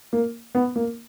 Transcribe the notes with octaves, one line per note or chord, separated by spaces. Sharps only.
A#3
B3
A#3